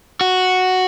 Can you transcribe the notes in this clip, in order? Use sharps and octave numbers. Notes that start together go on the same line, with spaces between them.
F#4